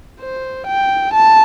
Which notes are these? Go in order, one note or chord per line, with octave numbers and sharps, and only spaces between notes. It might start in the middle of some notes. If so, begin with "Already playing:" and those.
C5
G5
A5